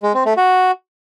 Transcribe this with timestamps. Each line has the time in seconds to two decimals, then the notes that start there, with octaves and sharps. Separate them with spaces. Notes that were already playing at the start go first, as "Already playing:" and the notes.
0.03 G#3
0.14 C4
0.26 A3
0.37 F#4